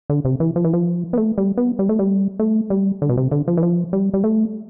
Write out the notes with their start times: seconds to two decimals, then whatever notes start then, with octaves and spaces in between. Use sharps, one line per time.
0.10 D3
0.25 C3
0.40 E3
0.56 F3
0.64 E3
0.73 F3
1.13 B3
1.17 A3
1.38 G3
1.57 B3
1.79 G3
1.89 A3
1.99 G3
2.39 A3
2.70 G3
3.02 D3
3.09 B2
3.17 C3
3.32 D3
3.48 F3
3.57 E3
3.63 F3
3.93 G3
4.14 G3
4.24 A3